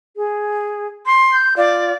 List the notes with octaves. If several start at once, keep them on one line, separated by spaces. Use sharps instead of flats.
G#4
C6
G6
F4 D5